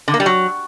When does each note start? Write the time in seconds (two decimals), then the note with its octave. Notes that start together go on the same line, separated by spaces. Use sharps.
0.08 D3
0.14 A#3
0.20 G3
0.26 F#3